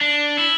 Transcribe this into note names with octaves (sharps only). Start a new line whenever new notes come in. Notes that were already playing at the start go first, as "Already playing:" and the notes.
D4
E4